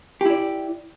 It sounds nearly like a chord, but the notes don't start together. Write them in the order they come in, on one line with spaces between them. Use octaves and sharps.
G4 E4 D5